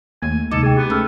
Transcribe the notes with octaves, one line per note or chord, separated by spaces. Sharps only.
D#2 A3 A#3 G#5
D2 C3 G#3 D#4 A4 D6
G#4 G5 G#5
B3 G4
A3 C#4 B5 E6 F6